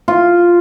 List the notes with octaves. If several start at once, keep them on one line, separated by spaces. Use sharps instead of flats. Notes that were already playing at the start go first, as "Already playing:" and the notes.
F4